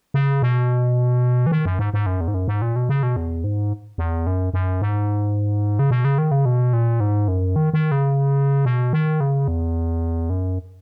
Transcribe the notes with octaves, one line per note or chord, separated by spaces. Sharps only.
C#3
B2
E3
D#3
F#2
G#2
G#2
F#2
E2
G#2
F#2
G#2
A#2
B2
C#3
B2
E2
G#2
E2
F#2
F#2
G#2
C#3
B2
C#3
D#3
C#3
B2
A#2
G#2
F#2
D#3
D#3
C#3
B2
D#3
C#3
E2
F#2